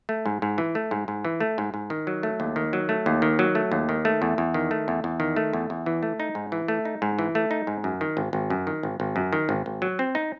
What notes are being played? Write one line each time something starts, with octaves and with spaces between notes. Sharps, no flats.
A3
G#2
G#2
E3
A3
G#2
G#2
E3
A3
G#2
G#2
D#3
F#3
A3
D#2
D#3
F#3
A3
D#2
D#3
F#3
A3
D#2
D#3
A3
E2
E2
D#3
A3
E2
E2
D#3
A3
E2
E2
E3
A3
D#4
G#2
E3
A3
D#4
G#2
E3
A3
D#4
G#2
F#2
D#3
G#1
G#1
F#2
D#3
G#1
G#1
F#2
D#3
G#1
G#1
F#3
C4
D#4